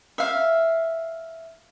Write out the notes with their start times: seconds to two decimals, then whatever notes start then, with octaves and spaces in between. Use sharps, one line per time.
0.18 E5 F5